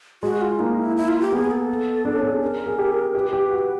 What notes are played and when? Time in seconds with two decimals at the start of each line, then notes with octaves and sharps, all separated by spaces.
0.23 G#3 F#4
0.41 F4
0.59 A#3 D#4
0.78 E4
0.97 E4
1.08 F4
1.20 G4
1.32 B3 G#4
1.51 A4
2.05 D4
2.15 C#4
2.24 D4
2.33 G#4
2.41 A#4
2.66 G#4
2.79 G4
3.15 G4 B4
3.33 G4
3.51 F#4